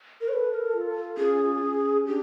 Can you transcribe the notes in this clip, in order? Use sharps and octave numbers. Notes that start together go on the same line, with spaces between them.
A#4
A4 B4 C#5
B4
A#4
F4
C#4 G#4
C#4
D4 G4